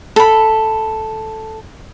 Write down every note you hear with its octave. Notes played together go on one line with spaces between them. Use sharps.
A4 B5